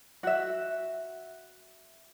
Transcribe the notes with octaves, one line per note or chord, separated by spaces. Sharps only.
F#4 E5